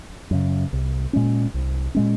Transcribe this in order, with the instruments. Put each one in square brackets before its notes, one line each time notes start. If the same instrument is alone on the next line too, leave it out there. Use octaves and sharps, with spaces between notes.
[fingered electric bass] F#2 C#3
C2
A#2 G#3 C#4
C2
A#2 G#3 C#4